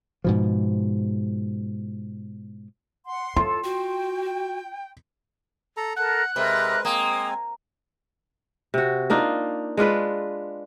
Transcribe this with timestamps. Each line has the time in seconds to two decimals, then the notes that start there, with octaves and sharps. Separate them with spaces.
0.24 G#2 B2 F3
3.06 F#5 C6
3.36 F4 A4 C6
3.64 F#4 G5
5.77 A4 A#5
5.97 A4 A#4 F#5 A5 F#6
6.36 C3 G#3 A#4 B4 E5
6.85 G#3 A#3 C4 G#5 A#5 D#6
8.74 C3 F#4
9.10 A#3 D4 D#4 F4
9.77 G#3 D4 F4 B4